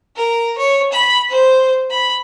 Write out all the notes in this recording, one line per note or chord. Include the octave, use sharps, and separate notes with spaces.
A#4
C#5
B5
C5
B5